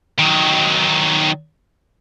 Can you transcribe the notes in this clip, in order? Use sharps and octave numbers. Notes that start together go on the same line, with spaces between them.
D#3 F#3